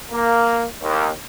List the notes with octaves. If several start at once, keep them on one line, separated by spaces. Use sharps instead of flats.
A#3
D#2